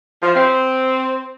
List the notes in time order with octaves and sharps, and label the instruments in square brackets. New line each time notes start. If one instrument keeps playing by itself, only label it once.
[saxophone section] F3
C4